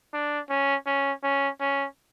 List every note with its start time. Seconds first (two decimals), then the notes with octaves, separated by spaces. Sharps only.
0.14 D4
0.49 C#4
0.86 C#4
1.23 C#4
1.60 C#4